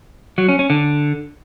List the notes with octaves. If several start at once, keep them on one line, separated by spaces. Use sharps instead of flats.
F#3
C#4
C#4
D3